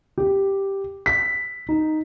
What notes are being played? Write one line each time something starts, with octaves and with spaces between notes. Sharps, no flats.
G4
B6
D#4